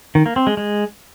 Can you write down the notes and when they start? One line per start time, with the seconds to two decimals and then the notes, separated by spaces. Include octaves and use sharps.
0.15 D#3
0.26 A#3
0.36 C4
0.47 G#3
0.57 G#3